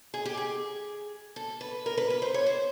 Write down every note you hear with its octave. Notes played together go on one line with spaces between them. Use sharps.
G#4
G4
G#4
A4
B4
A#4
B4
B4
C5
C#5
C5